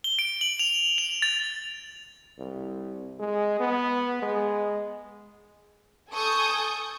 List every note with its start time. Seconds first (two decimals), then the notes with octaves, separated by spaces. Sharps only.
0.04 G7
0.19 D7
0.41 F#7
0.59 F7
0.98 F7
1.22 A6
2.38 C2
3.19 G#3
3.60 B3
4.22 G#3
6.11 A4 G#5 C#6 D#6 G6